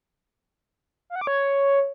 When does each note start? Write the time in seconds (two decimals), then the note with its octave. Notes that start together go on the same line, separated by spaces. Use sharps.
1.10 F5
1.16 F#5
1.21 D6
1.27 C#5